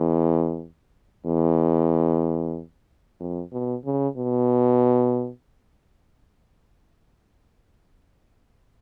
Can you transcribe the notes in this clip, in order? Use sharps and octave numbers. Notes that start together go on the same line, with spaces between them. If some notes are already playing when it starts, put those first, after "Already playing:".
Already playing: E2
E2
F2
B2
C#3
B2